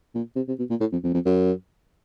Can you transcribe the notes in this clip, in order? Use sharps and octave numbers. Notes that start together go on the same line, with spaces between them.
A#2
C3
C3
B2
A#2
A2
F2
F2
F2
F#2